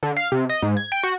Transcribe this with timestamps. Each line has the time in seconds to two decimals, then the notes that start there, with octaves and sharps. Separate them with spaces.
0.03 D3
0.16 F5
0.32 C3
0.49 D#5
0.62 G#2
0.77 G#6
0.92 G5
1.03 F#4